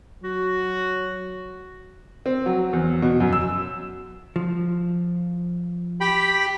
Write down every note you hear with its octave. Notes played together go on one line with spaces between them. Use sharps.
F#3 F#4
C4
F#3
E2
B2
F#2
E6
F3
G4 G5 B5